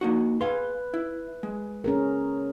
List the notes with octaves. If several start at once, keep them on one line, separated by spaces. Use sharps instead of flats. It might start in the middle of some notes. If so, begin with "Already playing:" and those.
A#3 D#4 F#4
G#4 B4 F5 C6
E4
G#3
C#4 G#4 A#4